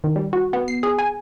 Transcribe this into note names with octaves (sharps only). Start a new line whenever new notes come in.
D#3
G3
F#4
B3
C7
G#4
G#5